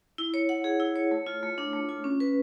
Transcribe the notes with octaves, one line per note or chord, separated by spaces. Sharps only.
E4
C#5
F#5
G#4
E4
C#5
A3
F4
A3
D4
A3
F4
C#4
B4